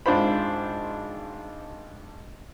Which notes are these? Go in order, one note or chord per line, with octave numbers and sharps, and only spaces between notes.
G#1 D4 F4 C5 B5